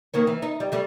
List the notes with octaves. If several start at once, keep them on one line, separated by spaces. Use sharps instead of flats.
D#3 A#3 C#4
E3
D#4
G3
G3 A3